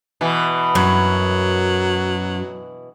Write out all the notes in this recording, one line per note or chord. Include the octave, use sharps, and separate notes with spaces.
B2 E3
F#2 F#3